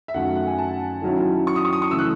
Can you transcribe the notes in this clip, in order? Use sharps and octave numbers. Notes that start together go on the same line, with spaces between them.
E5
F#2 D#3 F#3 A3 F#5
E5
F#5
G#5
A5
D#3 F#3 C#4 E4
C#6
D#6
C#6
D#6
C#6
C#3 E3 A3 E6
F#6